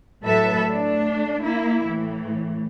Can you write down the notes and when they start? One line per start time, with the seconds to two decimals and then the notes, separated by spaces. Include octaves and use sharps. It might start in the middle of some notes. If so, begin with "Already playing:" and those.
0.24 A2 F#3 A4 B4 E5
0.70 A3 D4
1.44 A#3 E4
1.84 A2 E3